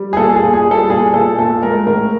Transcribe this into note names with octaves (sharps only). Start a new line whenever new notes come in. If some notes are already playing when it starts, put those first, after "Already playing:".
Already playing: G3
G#4
A#2 A4
G#4
A#2
G#4
G3
A4
A#2 G#4
A#2 A4
A#2 A4
G#3 A#4
A2 A#4